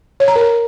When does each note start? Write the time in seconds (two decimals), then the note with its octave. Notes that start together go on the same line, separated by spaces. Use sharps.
0.20 C#5
0.28 A#5
0.36 A#4